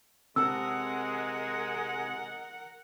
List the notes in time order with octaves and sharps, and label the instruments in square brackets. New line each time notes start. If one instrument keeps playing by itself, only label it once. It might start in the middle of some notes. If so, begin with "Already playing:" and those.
[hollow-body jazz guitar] C3 A4 [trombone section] G#3 [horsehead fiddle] A#4 F#5 [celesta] E6